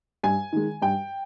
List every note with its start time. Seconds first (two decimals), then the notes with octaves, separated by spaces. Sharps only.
0.23 G2 G#5
0.53 D#3 G#3
0.82 G2 G5